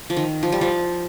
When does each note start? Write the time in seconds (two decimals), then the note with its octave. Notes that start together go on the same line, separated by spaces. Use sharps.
0.10 F3
0.16 D#3
0.43 F3
0.52 G3
0.61 F3